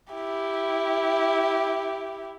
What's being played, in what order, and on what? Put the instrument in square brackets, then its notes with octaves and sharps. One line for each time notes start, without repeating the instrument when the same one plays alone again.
[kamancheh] E4 G4